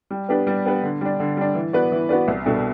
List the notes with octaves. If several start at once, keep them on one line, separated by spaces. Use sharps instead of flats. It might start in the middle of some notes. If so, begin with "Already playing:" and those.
G3
B3 D4 G4 B4
G3
B3 D4 G4 B4
D3
G3 D4
D3
G3 D4
E3
B3 F#4 B4 D5
E3
B3 F#4 B4 D5
C2
B2 G3 D4 A4